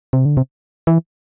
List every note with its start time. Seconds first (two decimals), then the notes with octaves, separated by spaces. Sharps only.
0.13 C3
0.25 D3
0.37 C3
0.87 E3